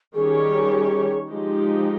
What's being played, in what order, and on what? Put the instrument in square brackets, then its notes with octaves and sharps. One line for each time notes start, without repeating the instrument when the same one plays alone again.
[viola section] D#3 G3 C#4 G4 C#5 [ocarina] G#4
[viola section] F3 G#3 D#4 G4